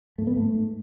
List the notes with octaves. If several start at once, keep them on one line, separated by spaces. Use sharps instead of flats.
G#2 A3
B3
G#2 A3
G#2